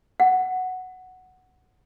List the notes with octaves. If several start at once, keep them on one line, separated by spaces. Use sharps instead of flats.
F#5